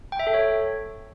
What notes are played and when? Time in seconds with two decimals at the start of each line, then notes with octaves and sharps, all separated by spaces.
0.12 G5
0.19 E5
0.27 A4
0.34 C#5